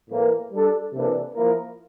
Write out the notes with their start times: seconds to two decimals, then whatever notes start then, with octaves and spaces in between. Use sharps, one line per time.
0.10 A2 E3 A#3
0.53 G3 D4 A4
0.93 C3 E3 A#3 D4 A4
1.34 F3 A#3 E4 A#4